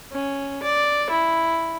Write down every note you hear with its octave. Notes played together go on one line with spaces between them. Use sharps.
C#4
D5
E4